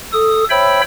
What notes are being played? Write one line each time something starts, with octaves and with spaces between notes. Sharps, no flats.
A4 D#6
C5 C#5 E5 G5 B5 E6